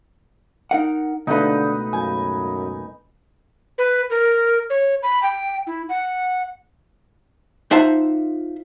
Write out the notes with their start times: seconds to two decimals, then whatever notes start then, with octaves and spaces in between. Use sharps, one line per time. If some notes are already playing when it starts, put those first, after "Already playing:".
0.71 D#4 A#4 F#5
1.27 C#2 B2 D3 A3 D#4 B4
1.93 F#2 G#5
3.78 B4
4.10 A#4
4.70 C#5
5.03 B5
5.23 G5
5.67 E4
5.89 F#5
7.71 D#4 F4 C5 E5 F#5 A5